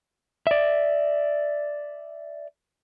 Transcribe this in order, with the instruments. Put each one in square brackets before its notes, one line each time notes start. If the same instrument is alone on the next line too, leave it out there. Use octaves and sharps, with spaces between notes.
[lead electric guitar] D5 E5